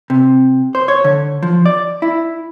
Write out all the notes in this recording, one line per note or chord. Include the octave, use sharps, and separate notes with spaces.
C3
C5
C#5
D3
F3
D5
E4